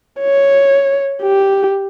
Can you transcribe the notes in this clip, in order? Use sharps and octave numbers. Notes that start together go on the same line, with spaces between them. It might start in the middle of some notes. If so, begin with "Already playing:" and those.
C#5
G4